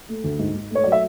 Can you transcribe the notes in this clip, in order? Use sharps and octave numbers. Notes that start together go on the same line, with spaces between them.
A3
D2
G#2
G#2
A3 C#5
F#3 D5
E5